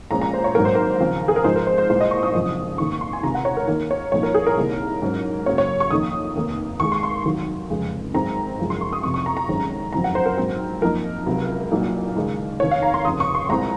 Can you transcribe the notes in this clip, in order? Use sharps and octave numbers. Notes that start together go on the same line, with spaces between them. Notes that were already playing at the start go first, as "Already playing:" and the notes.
A#1 A#2 G#3 C#4 A#5
A#5
C5
C#5
G#1 G#2 F#3 A#3 A#4
C5
A#4
D#2 C#3 F3 C4
G#4
A#4
G#2 F3 G#3 D#4 C5
A#4
C5
C5
C2 A#2 G#3 D#4 C5
D#5
C#6
D#6
G#1 F#2 C#3 F3
F1 D#2 D#3 A#3 C#6
C6
G#5
C#2 C3 D#3 A#5
F#5
C#5
A#4
D#2 D#3 A#3 D#4 A#4
C#5
C2 A#2 F3 A#3 D#4 C#5
A#4
G#4
A#4
C2 C3 D#3 A#3 D#4
G#2 F#3 C#4
F#2 C#3 F#3 A#3 C#5
C#5
C#6
F2 D#3 A#3 D#4 D#6
F1 D#2 D#3 A#3
D#2 D#3 G#3 C#6
C6
C6
F1 D#2 D#3 F#3
F1 F2 C#3 G#3
G#1 F#2 D#3 G#3 C4 A#5
F#1 F#2 C#3 F3 G#3
C6
C#6
D#6
F1 F2 C3 C#6
C#6
A#5
A#5
G#1 F#2 D#3 G#3 C#4
F#1 F2 D#3 F#3 C4 A#5
F#5
C5
A#4
A#1 G#2 F#3 C4
F#2 F3 A#3 D#4 A#4
C#2 C3 F#3
C2 A#2 F#3 A#3 D#4
D#2 C#3 G#3 D#4
F1 D#2 D#3 C#5
F5
A#5
C6
F1 F2 C#3 D#6
C#6
C6
C2 A#2 G#3 C4 A#5